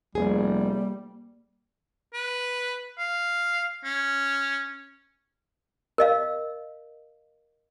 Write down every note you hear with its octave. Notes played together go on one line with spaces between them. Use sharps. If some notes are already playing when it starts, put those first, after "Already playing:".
F1 G3 A#3 G#4
B4
F5
C#4
A#4 D#5 F5